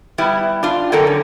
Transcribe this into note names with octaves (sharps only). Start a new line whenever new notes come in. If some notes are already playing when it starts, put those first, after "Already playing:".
G3 B3 E4
D4 F4
D3 F#3 C4 A4 A#4
C#4